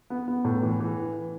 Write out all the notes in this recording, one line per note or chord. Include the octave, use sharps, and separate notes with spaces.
B3
B3
A2
E3
E3